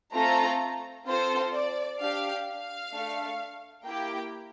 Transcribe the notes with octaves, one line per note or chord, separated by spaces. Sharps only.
A3 C4 F4 A4 A#5
C4 F4 A4 C5
D5
D4 G4 F5
F5
A3 D4 A4
A#3 E4 G4 G5